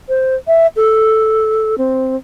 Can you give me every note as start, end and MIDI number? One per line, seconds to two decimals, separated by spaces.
0.09 0.35 72
0.47 0.67 76
0.76 1.78 69
1.78 2.16 60